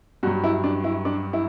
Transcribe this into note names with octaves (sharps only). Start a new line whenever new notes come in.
G2 F#3 F#4
E4
D4
E4
D4
E4